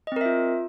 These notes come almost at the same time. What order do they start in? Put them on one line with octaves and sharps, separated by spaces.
D#5 C4 A#4 E5 F4